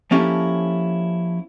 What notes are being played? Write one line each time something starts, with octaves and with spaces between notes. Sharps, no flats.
F3 A#3 C#4 E4 G4 A4